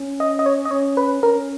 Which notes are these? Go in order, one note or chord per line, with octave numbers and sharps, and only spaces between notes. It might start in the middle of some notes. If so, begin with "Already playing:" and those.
Already playing: C#4
D#5
D#5
C#5
D#5
C#4 C#5
B4
C#4 A#4